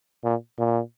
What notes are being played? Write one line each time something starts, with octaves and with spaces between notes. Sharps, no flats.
A#2
A#2